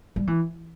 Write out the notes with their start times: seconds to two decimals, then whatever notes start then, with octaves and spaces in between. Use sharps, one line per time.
0.16 G3
0.27 E3